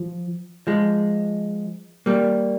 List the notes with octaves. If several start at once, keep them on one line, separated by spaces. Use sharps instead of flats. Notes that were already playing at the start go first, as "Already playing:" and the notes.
Already playing: F3
F3 G#3
G3 A#3